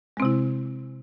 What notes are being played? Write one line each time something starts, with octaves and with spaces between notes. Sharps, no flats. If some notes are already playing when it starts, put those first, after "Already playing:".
C3 G#3 C4 E4